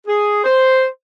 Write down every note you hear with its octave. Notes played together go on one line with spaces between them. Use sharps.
G#4
C5